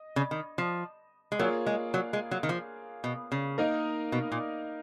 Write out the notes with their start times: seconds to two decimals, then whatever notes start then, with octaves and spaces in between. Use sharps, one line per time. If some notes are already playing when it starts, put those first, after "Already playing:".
Already playing: D#5
0.16 C#3
0.31 D#3
0.58 F3
1.32 G#3
1.39 F#3 A#3 F4 G#4 C#5
1.66 G#3
1.94 F#3
2.13 G#3
2.31 F#3
2.43 D#3
2.49 F3
3.04 B2
3.32 C#3
3.58 A#3 D#4 A#4 D#5
4.12 B2
4.32 A#2